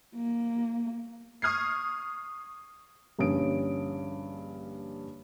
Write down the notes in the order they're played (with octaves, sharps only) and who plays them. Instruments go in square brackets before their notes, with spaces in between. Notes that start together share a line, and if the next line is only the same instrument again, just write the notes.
[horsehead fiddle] A#3
[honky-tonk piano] C#6 D#6 F6 G#6 C7
[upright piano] A#1 G2 D3 C#4 D#6 D7